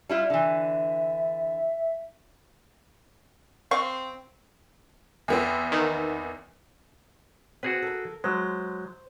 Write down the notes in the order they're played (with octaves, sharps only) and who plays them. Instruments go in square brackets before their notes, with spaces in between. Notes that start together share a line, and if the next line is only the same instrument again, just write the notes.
[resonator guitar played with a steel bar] G3 E4 F4 [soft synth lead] E5
[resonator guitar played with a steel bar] D3 E3
[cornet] C4 [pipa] F5 C#6
[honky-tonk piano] E2 B3 C4
[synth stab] D#3
[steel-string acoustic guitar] C4 [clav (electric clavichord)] F#4 G#4 B4
[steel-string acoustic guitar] A4 A#4
[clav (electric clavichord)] F#3 G#3 [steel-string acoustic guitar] C5